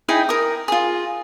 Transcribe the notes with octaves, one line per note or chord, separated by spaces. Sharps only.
D#4 E4 G#4 G5
A#4 D#6
F4 G#4